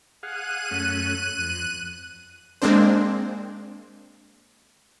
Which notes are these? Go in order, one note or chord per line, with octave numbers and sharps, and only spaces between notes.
G#4 F5 F#5 F#6 D#7
F#2 A3 C#4
F2
G#3 A#3 C4 D4 C5